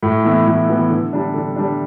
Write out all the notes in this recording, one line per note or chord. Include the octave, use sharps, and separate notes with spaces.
A2
E3 B3 E4
A2
E3 B3 E4
D3
G3 D4
D3
G3 D4